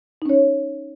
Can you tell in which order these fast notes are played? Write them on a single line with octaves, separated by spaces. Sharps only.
D#4 C#4 C#5